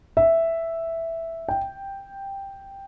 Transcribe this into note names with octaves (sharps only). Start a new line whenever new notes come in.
E5
G5